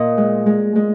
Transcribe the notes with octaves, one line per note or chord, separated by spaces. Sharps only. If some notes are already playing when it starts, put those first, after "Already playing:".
Already playing: A#2 D#5
G#3
G#3
G#3